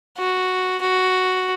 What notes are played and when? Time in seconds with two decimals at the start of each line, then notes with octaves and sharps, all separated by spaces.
0.18 F#4
0.81 F#4